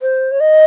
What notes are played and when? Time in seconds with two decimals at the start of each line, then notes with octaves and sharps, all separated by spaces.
0.02 C5
0.32 C#5
0.40 D#5